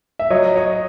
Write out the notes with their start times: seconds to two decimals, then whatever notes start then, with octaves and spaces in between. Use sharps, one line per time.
0.19 E5
0.30 F#3 C#5 D#5
0.56 C#5 D#5